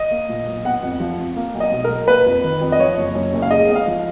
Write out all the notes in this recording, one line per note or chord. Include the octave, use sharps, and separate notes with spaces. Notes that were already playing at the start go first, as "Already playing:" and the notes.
Already playing: D#5
A#3
A#2
B1
B3 F#5
F2
F3
F2
A#3
B1
D#5
B2
B1 A#4
A#3 B4
F2
D#3
F2
D#5
F3 C#5
F#1
F#2
F#1
F5
G#3 D#5
B3
F5
F3